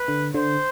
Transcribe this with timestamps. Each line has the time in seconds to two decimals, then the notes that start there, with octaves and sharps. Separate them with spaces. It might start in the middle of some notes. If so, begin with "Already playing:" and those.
Already playing: B4
0.08 D3
0.34 D3 C5